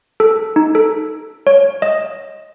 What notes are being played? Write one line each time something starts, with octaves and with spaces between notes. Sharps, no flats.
A4
D#4
A4
C#5
D#5